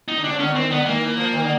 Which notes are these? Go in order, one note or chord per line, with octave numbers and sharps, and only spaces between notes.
D#4
D3
C3 D4
C#3
D3 C#4
E3
D#3 C4
D3 B3
D#3 A#3
E3
F3
D#3
D3